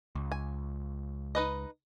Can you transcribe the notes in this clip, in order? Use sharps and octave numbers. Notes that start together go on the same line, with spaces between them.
C#2
G#5
D#4 B4 D#5